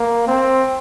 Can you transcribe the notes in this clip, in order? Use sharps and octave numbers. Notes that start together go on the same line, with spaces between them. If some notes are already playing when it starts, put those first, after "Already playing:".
Already playing: A#3
C4